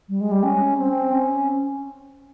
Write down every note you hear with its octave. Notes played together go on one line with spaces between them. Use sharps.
G3
G#3
G3
C#4
C4
C#4